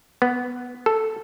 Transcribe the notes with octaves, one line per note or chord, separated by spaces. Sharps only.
B3
A4